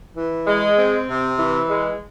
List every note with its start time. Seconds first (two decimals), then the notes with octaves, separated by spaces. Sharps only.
0.16 E3
0.47 G#3
0.77 C4
1.09 C3
1.39 E3
1.70 G#3